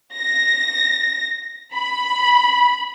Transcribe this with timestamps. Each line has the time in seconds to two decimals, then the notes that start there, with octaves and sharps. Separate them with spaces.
0.16 A#6
1.75 B5